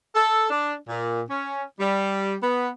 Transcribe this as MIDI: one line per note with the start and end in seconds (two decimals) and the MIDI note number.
0.16 0.49 69
0.50 0.74 62
0.89 1.23 46
1.29 1.64 61
1.80 2.35 55
2.43 2.69 59